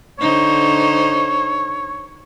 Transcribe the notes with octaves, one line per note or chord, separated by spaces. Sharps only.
D3 D#4 C5 C#5